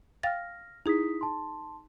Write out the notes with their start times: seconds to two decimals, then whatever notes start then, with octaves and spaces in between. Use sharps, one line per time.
0.23 F5 G5 F6 A6 A#6
0.86 D#4 E4 G#4 D#6 B6
1.21 A5 C6